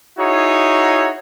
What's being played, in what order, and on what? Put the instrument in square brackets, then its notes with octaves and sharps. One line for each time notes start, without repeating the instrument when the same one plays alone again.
[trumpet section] D#4 E4 F#4 G#4 C#5